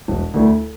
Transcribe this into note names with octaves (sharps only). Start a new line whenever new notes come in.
E1
D2 D3 A3 E4